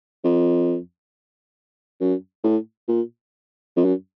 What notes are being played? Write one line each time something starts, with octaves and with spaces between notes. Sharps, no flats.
F2
F#2
A2
A#2
F2
F#2